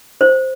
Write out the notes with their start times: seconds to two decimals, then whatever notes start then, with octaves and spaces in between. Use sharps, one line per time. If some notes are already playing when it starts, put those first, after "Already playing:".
0.21 C5